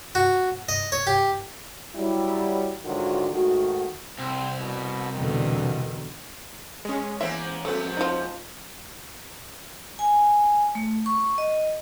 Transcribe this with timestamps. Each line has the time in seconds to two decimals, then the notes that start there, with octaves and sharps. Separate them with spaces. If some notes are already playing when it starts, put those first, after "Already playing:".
0.15 F#4
0.69 D#5
0.92 C#5
1.07 G4
1.95 F#3 G3 E4
2.85 G#2 D3 D#3 F#3 F4 F#4
3.32 G#2 D#3 A3 F#4
4.19 C2 C4
4.59 B2
5.13 E2 B2 D3 D#3
6.85 G#3 C#4 G#4
7.21 E3 A#3 B3 C5 E5
7.65 F2 A3 B3 B4 C5
7.97 F3 D#4
9.99 G#5
10.75 A3
11.06 C#6
11.38 D#5